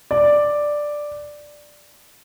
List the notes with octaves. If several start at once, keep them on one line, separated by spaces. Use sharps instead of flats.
D5